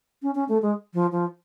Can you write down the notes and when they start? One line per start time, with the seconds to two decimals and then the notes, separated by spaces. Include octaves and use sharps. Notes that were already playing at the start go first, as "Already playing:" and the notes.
0.22 C#4
0.35 C#4
0.49 A3
0.62 G#3
0.94 F3
1.12 F3